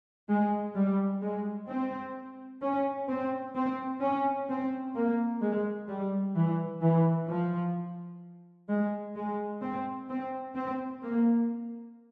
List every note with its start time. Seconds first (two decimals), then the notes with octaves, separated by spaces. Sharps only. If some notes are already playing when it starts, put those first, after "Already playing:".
0.29 G#3
0.75 G3
1.21 G#3
1.68 C4
2.62 C#4
3.08 C4
3.55 C4
4.01 C#4
4.49 C4
4.95 A#3
5.41 G#3
5.88 G3
6.35 E3
6.81 E3
7.28 F3
8.69 G#3
9.16 G#3
9.62 C4
10.09 C4
10.55 C4
11.03 A#3